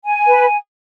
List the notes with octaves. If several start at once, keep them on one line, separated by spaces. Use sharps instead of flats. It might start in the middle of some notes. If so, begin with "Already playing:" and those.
G#5
B4